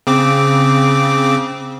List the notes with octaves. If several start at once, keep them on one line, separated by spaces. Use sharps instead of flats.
C#3 C4 D6